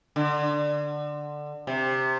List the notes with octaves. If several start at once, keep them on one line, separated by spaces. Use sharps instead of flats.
D3
C3